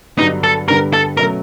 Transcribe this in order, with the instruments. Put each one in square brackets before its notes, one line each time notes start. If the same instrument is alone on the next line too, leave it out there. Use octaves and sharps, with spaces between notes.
[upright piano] G2 D3 F#3 B3 D4 [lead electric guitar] D#4
[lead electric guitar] A4
[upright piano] G2 D3 G3 B3 [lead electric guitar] A#4
[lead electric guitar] A4
[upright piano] B2 F#3 A3 C#4 [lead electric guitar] A#4